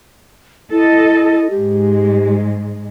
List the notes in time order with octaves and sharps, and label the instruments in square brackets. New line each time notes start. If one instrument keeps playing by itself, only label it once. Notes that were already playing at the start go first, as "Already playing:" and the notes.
[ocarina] E4 [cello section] A4 D#5
[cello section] G#2 G#3 [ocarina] G4